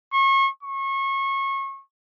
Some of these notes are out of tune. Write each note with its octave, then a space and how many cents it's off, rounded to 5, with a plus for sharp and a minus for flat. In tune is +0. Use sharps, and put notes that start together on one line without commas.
C#6 -35
C#6 -30